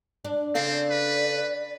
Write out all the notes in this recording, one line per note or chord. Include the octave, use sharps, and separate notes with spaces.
D4
C#3 C4 A4 D5 F5
B4